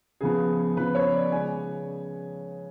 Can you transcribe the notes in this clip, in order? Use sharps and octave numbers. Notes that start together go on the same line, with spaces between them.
C#3 F3 B3 G#4
C#3 F3 B3 B4
C#5
D5
C#3 G#3 C#4 G#5